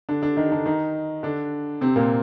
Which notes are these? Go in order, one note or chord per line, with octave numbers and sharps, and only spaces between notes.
D3 D4
D3 D4
D#3 D#4
D3 D4
D#3 D#4
D3 D4
C3 C4
A#2 A#3